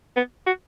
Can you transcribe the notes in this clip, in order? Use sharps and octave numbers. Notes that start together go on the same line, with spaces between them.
B3
F#4